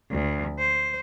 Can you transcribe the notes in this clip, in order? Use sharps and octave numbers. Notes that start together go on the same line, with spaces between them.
D2
C5